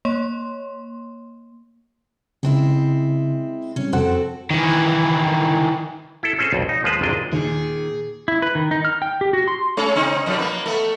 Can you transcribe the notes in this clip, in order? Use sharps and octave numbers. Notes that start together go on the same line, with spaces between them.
A#3 C#5 C6
C#3 G#3 C4 E4
C3 G3 C#4
F2 C4 F#4 A4 C5 F#5
D#3 E3
E4 A4
C4 C#4 G#4 A4 C5
B1 F2
D#4
D#2 F3 G#3 F4 B4 C5
G#1 F2 C3 G#3 D4 D#5
D#2 A#2 D#3 G#4
E4
B4
D#3
D#4
F6
G5
G4
F#4
C6
G#3 C#4 C#5
C#3 C4 D#4
F2 B2 G3
A#3 B4
A3 B3